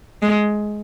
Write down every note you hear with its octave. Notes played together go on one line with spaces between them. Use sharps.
G#3